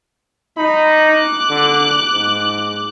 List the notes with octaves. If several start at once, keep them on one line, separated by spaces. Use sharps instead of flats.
D#4 B5
D6 F#6
D3
G#2